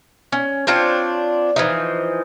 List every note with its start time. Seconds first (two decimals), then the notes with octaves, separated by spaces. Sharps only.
0.32 C#4
0.67 C4 D4 F4 C#5
1.56 E3 F3 D#4